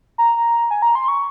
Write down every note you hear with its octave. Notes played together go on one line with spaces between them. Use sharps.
A#5
G#5
A#5
C6
C#6